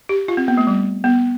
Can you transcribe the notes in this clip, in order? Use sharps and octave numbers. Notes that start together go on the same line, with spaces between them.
G4
F4
C4
B3
A3
G3
B3